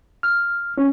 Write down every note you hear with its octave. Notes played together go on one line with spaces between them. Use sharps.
F6
C#4